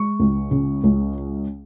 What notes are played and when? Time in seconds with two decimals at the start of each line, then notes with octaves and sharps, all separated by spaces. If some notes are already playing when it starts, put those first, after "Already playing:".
Already playing: G#3 C#6
0.20 C#2
0.51 C#3
0.83 C#2